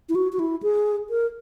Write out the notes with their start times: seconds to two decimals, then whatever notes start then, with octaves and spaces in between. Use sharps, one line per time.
0.09 E4
0.15 F#4
0.32 F#4
0.39 E4
0.63 G#4
1.10 A#4